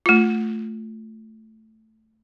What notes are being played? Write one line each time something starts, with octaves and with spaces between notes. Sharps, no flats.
A3 F4